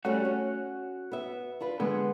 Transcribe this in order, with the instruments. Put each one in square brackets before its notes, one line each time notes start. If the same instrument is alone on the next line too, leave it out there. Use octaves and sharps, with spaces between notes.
[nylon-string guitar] G3 A3 C#4 [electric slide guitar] F#4 F#5
[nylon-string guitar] C#4
B3 E5
D4 F4 B4
[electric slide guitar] D3 G#3 [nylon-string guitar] B3